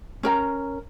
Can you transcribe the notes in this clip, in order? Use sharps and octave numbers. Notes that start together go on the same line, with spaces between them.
C#4 A#4 A#5